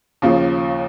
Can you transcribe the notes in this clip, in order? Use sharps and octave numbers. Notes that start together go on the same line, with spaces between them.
D#2 C#3 F3